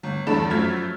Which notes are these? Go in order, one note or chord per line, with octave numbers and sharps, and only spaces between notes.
G1
E2 G2 D4 A4 B5 E7
F#2 F3 A3 F6 G#6 B6